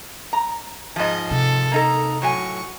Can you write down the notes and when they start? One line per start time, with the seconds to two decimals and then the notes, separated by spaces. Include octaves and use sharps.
0.33 A#5
0.96 G#2 F3 G#4 D#5
1.31 C3 A4
1.72 A#3 D#4 A4 A#5
2.22 A2 F#3 G#5 C#6